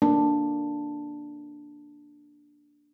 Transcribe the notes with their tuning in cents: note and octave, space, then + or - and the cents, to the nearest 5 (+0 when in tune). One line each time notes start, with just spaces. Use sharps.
A#3 +0 D4 +0